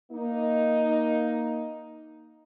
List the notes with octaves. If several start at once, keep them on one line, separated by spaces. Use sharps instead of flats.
A#3 D#4